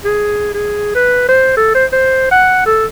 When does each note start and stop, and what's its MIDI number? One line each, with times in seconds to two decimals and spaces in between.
0.05 0.54 68
0.54 0.94 68
0.95 1.28 71
1.29 1.52 72
1.57 1.70 69
1.75 1.86 72
1.92 2.30 72
2.31 2.62 78
2.66 2.86 69